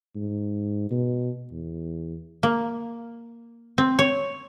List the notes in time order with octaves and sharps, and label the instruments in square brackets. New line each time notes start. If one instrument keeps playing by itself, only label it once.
[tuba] G#2
B2
E2
[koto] A#3
C4
C#5